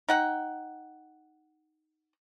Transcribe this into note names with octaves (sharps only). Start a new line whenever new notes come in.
D#4 F#5 G5